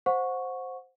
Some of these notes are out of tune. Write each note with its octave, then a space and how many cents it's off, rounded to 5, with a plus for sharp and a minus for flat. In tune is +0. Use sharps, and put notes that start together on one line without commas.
C5 +0 F#5 -25 C#6 +0